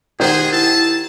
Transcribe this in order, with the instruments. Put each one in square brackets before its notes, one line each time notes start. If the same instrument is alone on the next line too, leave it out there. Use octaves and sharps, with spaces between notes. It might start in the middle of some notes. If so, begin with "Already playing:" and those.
[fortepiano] D#3 [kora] G4 C5 F#5 [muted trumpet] G#4
[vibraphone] E4 [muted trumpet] A5